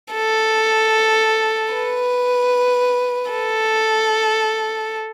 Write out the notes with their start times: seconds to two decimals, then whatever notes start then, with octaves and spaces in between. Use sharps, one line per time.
0.14 A4
1.73 B4
3.31 A4